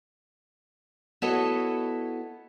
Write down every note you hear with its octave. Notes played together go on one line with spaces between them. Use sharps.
B3 E4 F#4 A4 C#5 D#5